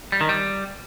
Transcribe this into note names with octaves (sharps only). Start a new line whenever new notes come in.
G3
D#3
G3